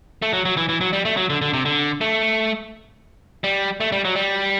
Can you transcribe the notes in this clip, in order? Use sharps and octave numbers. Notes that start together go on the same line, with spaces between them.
A3
F#3
F#3
E3
E3
F#3
G3
A3
F#3
D3
D3
C3
D3
A3
G3
A3
G3
F#3
G3